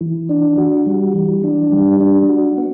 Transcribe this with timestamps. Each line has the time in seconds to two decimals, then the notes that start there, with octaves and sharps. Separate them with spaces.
0.01 E3
0.29 D4
0.57 F#4
0.86 G3
1.14 E3
1.43 D4
1.72 G3
2.00 D4
2.29 F#4
2.58 B3